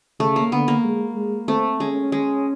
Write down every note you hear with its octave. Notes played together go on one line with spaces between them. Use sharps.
C#3 A3
A#3
D3 B3
A#3
G#3
G#3
A3 C4
G#3 C#4
G#3